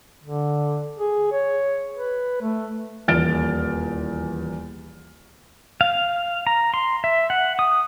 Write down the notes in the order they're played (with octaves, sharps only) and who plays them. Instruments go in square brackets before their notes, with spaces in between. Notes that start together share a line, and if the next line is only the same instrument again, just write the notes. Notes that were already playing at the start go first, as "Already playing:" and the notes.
[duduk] D3
G#4
C#5
B4
A3
[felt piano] D#1 E2 F6 A6 D7
[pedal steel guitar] F5
A#5
C6
E5
F#5
D#6